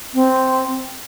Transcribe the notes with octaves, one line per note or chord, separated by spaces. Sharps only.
C4